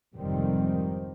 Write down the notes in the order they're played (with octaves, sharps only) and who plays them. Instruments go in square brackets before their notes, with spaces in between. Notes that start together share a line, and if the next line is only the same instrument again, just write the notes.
[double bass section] F1 F2 G#2 D#3 G3 C4